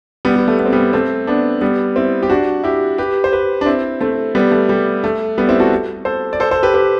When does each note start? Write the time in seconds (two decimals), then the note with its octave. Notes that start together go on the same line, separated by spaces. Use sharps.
0.25 G3 B3
0.36 G3
0.48 A3
0.59 B3
0.66 C4
0.73 G3 B3
0.93 A3 C4
1.27 B3 D4
1.61 G3 B3
1.96 C4 E4
2.23 G4
2.30 D4 F#4
2.64 E4 G4
2.98 G4 B4
3.24 C5
3.32 G4 B4
3.61 D4
3.66 C4 E4
4.01 A3 C4
4.35 G3 B3
4.51 A3
4.69 G3
5.04 A3
5.38 G3 B3
5.49 C4 E4
5.60 F#4 A4
6.05 A4 C5
6.33 D5
6.40 A4 C5
6.51 A4 C5
6.63 G4 B4
6.74 G4 B4